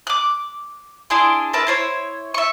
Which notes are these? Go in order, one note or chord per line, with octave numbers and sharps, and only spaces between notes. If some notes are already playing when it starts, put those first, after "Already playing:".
D6 F#6
D4 E4 G#4 C6
A#4 B4 E5 A5
E4 C5 C#5
E5 C#6